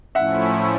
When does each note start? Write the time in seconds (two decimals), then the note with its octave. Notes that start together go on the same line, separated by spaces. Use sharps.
0.15 A2 F3 A3 C#4 E4 E5 F#5